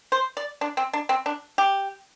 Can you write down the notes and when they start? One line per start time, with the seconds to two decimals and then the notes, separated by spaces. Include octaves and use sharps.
0.12 C5
0.37 D5
0.61 D4
0.77 C4
0.93 D4
1.09 C4
1.26 D4
1.58 G4